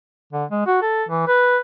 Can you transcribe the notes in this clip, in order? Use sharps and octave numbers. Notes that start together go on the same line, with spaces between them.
D3
G#3
F#4
A4
E3
B4